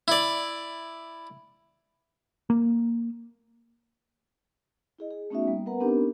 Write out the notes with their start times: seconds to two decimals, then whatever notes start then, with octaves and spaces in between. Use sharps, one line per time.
0.08 E4 D5
2.50 A#3
4.99 E4 G#4 D#5
5.11 G#4
5.30 A3 B3 C#4 D#4 F#4 E5
5.47 G3 A#3 B3
5.66 B3 A#4 B4 F#5 A#5
5.80 B3 C4 D4 D#4 G4 A#4